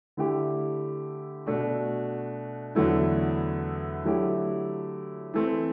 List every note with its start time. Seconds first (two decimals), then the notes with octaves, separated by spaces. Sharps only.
0.17 D3 A3 E4 G4
1.46 B2 A3 D4 F#4
2.75 E2 D3 F#3 A3 E4
4.04 D3 F#3 A3 E4 G4
5.34 E3 A3 C4